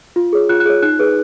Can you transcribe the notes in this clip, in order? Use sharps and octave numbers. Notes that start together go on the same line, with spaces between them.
F4
G#4 C#5
F4 F#6
F#6
G#4 C#5
D#4 F#6
G#4 B4